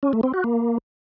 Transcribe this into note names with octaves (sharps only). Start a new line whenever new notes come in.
C#4
A3
C4
F#4
A#3